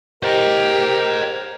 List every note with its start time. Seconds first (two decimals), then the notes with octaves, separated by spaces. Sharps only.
0.23 G4 A#4 C5 D#5